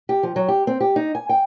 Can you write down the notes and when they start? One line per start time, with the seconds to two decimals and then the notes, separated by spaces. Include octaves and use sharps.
0.09 G4
0.23 F3
0.36 F#3
0.48 G4
0.67 C4
0.81 G4
0.96 D#4
1.15 G#5
1.29 G5